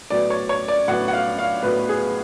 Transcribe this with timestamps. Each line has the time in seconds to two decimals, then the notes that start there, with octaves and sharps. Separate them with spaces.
0.10 A2 F#3 B3 D5
0.30 C#5
0.49 C#5
0.68 D5
0.88 A2 F#3 B3 F#5
1.08 F#5
1.13 F5
1.38 F5
1.63 A2 F#3 B3 B4
1.89 G#4